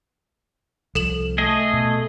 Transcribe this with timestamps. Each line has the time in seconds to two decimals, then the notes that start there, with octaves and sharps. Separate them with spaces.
0.95 C2 F3 A4 E7 F#7
1.38 A3 G#4 D#5
1.73 B2